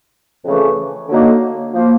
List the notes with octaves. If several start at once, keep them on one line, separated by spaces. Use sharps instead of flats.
F2 C#3 E3 A3
D3 F#3 A#3 D#4
F3 A#3